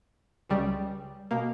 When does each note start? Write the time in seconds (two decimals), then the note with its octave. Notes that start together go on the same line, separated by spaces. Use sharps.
0.50 C#2 C#3 G3
1.31 B2 A#3